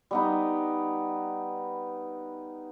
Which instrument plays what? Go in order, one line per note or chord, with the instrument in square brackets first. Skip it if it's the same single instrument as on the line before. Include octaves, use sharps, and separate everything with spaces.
[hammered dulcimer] G3 B3 D#4